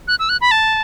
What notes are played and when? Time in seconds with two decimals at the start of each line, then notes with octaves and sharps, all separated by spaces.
0.08 F#6
0.19 E6
0.29 F#6
0.41 B5
0.51 A5